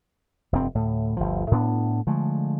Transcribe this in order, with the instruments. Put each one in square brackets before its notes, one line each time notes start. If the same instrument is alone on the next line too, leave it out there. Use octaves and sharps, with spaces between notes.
[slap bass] F1 G2 C4
D2 A2
G1 D2 F3
A2 B3 D4
D3 F3 G#3 A3